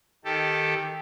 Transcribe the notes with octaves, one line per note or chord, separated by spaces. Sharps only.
D#3 G4 A4